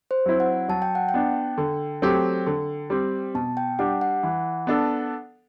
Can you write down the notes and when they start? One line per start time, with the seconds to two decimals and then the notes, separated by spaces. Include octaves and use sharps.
0.11 C5
0.26 F#3 C4 E4
0.40 F#5
0.69 F#3 A5
0.82 G5
0.95 F#5
1.09 G5
1.14 B3 D4
1.57 D3
2.02 F#3 A3 C4 G4
2.46 D3
2.90 G3 C4
3.34 B2 A5
3.57 G5
3.79 G3 D4 G4 F#5
4.01 F#5
4.23 E3
4.67 B3 D4 A4